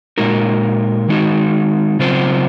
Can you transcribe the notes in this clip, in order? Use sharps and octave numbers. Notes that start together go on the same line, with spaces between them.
A#2 G#3 D#4 F#4 A#4
D#3 G#3 D#4 F#4
C#3 F#3 C4 F4 C5